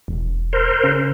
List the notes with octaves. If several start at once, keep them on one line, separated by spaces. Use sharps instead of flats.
E1
A#4 C5
C#3